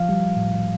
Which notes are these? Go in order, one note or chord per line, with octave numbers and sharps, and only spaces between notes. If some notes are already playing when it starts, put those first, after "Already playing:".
Already playing: F3 F5
G3
A2